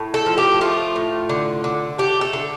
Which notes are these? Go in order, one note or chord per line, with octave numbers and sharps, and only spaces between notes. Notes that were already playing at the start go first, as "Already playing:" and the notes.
Already playing: A2
A4
F3
G4
A3 F4
A2
D3
D3
A3 G4
A4
D3